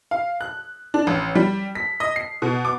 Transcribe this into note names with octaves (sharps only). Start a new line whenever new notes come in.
F5
F#6
D4
A1
G3
B6
D#5
C7
B2
D6